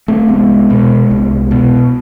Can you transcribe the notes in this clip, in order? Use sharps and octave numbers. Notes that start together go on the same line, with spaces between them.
A3 C4
C2 G#3 B3
B2
C2
B2